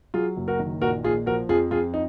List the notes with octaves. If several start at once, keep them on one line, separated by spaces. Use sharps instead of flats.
F#3 F4 G#4
F#1
F#4 A#4
D#3
A#1 F#4 A#4
A#1 F4 G#4
F3 F#4 A#4
F2 F4 G#4
F2 F4 G#4
D#4